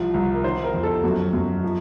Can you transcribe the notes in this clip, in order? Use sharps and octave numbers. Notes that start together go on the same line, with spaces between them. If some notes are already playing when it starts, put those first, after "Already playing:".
Already playing: C2 F3
C2
A#4
D#3 C5
A#4
F2
A4
F#2 F#4
F#2
F3